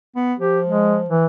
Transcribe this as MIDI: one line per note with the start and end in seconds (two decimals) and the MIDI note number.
0.16 0.34 59
0.39 1.12 53
0.39 0.59 67
0.66 0.99 56
1.09 1.26 52